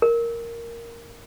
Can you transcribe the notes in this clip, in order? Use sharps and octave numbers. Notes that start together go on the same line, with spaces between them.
A#4